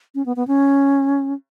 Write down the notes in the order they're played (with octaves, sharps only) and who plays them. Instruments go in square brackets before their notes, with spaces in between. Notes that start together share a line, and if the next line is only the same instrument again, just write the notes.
[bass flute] C#4
B3
B3
C#4